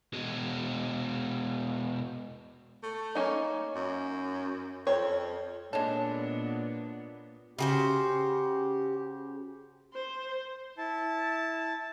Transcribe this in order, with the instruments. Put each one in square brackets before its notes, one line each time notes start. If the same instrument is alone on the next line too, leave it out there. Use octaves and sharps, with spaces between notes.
[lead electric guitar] B2 G#3
[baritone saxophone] A3
[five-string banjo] A#3 C#4 D#4
[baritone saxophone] F#2
[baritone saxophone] F2 [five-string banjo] C4 C#5
[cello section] A#2 B3 [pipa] G#3 A4 [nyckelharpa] D4 [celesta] C#5
[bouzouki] C#3 F#4 C5 [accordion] G4
[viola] C5
[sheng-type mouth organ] E4 A5